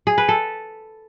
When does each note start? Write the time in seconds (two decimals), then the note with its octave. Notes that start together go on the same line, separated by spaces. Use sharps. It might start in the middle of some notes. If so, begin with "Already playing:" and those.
0.07 G#4
0.18 B4
0.29 A4